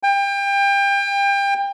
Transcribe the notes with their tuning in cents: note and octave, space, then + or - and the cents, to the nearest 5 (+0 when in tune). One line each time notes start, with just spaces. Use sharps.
G5 +30